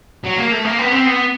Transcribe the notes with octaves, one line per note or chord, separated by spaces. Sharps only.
F#3
A#3
A3
A#3
B3
C4
B3